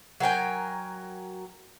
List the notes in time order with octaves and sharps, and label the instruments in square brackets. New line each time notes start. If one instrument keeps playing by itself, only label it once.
[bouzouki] F#3 A#4 G5 G#5